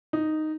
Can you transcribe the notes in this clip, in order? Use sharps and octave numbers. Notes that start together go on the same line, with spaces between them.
D#4